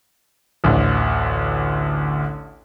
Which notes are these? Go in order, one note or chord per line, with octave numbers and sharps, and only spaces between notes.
A1 D2